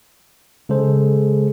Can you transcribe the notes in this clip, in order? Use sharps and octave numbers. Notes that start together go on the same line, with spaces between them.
C#3 G#3 G#4 A4 C5